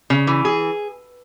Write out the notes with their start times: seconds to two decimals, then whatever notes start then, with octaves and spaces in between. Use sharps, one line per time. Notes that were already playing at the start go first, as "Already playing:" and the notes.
0.10 C#3
0.27 E3
0.45 G#4